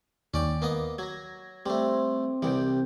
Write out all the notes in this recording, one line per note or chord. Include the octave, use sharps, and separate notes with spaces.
D#2 C#4 D5 G5
A#3 B3 D#5
F#3 G#6 A#6
G3 A3 C4
C2 E3 G3 G5